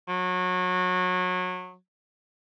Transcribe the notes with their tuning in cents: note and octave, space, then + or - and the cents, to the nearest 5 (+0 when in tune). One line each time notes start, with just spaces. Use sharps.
F#3 -25